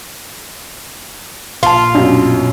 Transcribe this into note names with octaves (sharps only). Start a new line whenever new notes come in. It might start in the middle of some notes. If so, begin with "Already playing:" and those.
A#1 A#2 F4 F5 A5
F#2 B2 D4 G4